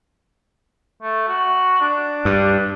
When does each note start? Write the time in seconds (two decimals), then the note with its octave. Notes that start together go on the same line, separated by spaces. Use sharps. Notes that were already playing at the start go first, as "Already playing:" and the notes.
1.03 A3
1.28 F#4
1.81 D4
2.25 G2